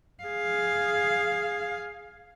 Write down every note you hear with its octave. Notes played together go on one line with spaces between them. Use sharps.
G#4 F5